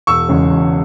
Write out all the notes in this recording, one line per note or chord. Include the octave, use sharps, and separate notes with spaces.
E1 C#6 E6
E2 C#3 G#3 C#4
E1